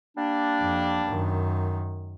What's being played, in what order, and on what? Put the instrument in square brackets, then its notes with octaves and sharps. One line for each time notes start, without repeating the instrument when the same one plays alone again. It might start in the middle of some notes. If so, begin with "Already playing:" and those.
[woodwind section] G3 A#3 D4
[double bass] F2
F#2 D#3